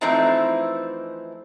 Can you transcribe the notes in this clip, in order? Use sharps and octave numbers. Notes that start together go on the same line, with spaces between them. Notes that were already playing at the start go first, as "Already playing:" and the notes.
E3 F3 A3 C4 D#4 E4